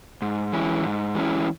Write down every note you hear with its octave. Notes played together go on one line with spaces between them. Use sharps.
G#2
E3 G#3 C#4 E4
G#2
E3 G#3 C#4 E4